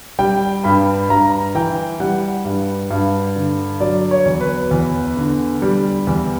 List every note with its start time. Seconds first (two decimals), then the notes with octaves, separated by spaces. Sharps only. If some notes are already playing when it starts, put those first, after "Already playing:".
0.19 G3 G5
0.64 G2 B5
1.09 G2 A#5
1.55 E3 G5
2.00 G3 F#5
2.45 G2
2.91 G2
3.36 D3
3.80 F#3 D5
4.11 C#5
4.26 E2
4.41 B4
4.71 E2
5.17 D3
5.62 G3
6.07 E2